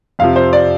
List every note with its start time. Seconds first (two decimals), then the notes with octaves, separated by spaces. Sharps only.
0.19 F2 C3 F3 F5
0.36 C5
0.53 D5